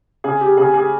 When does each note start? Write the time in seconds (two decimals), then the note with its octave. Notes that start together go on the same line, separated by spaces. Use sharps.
0.24 C#3 G#4
0.41 G4
0.57 C#3 G#4
0.74 G#4